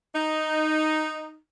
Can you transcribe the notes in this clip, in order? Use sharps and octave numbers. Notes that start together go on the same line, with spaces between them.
D#4